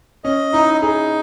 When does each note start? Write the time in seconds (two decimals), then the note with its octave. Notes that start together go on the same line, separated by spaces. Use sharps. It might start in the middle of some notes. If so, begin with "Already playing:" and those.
0.24 C#4 D#5
0.53 D#4 E4
0.81 D#4 G#4